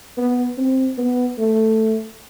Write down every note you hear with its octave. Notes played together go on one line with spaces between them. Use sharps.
B3
C4
B3
A3